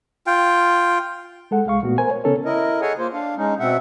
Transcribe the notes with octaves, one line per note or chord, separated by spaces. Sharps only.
F4 G5
G#3 A4 F#5
C2 G#3 F5 C#6
A#2 A3 B3 F#4
A#4 C5 G#5
C#5
C#3 B3 C#4 A4 A#4 C#5
E4 A#4 D#5
G#4 A4 C#5 D#5 F#5 G#5
A#3 F4 C5
D4 F5
G#3 C#4 D#4
B2 C4 E5 F#5